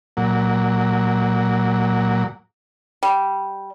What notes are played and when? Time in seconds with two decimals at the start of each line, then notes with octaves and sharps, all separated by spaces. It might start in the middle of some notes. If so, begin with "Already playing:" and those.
0.17 A#2 F#3
3.03 G3